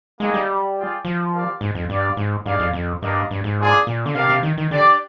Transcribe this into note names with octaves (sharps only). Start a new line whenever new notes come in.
G#3 A#3 D#4 G#4 D#5 G5
G3
F4 G#4 D5 G5
F3
C4 G4 A#4 D5 F5
G#2
F2
G2 D4 G4 D5 F5
G#2
G2 D#4 G#4 D5 F5
F2
F2
G2 A#3 D4 G4 A#4 D#5
G2
G#2
A#3 D4 F4 G#4 D5
A#2
D3
C3 D4 G4 A#4 F5
C3
D#3
D#3
D3 D4 G4 D5